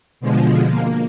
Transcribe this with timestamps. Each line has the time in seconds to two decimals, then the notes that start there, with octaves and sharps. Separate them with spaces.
0.20 B2 D3 F3 G#3
0.68 A#3